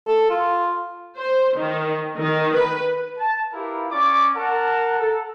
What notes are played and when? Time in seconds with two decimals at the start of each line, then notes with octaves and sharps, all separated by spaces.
0.07 A4
0.30 F4
1.16 C5
1.56 D#3
2.17 D#3
2.54 B4
3.18 A5
3.53 E4 F4 G4 A#4 B4 F5
3.90 C#4 D5 C#6 D6
4.35 A#4 F#5 A5
4.99 A4